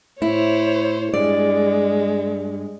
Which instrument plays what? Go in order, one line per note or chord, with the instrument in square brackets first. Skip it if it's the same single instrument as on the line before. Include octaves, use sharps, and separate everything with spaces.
[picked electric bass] A2 [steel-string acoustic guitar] E4 [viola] C5 C#5
[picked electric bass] G2 [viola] G#3 [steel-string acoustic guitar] D5